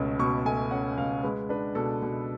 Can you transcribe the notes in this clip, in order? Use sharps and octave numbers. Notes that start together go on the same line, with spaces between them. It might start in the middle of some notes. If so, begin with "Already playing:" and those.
Already playing: C#2 B2 A3 C#4
B2 C#6
A3 G#5
C#4 F#5
C#2 F5
G#3 B4
D4 B4
B2 A4
B2